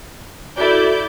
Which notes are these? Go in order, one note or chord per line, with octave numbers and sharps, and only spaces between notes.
E4 F#4 A4 D5 G6